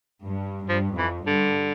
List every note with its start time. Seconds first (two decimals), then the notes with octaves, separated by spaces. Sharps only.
0.24 G2
0.68 G2 F3
0.98 F2 E3
1.27 G2 D3